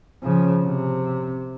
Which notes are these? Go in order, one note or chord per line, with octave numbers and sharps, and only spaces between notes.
C#3 F3
C3